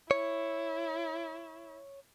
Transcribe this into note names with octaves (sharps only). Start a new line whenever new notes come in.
E4 C#5